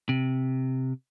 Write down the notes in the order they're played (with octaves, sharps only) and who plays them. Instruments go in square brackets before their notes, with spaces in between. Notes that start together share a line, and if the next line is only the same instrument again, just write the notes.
[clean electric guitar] C3